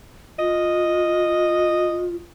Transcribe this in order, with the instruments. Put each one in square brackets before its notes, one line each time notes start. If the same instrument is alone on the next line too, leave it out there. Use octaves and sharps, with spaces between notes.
[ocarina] F4 [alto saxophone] D#5